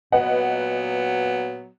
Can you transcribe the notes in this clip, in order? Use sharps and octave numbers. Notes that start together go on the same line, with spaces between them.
A#2 F#3 B3 B4 D#5 F#5